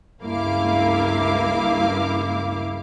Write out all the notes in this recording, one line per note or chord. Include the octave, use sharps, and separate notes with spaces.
C#2 G2 A#3 E4 F5 D6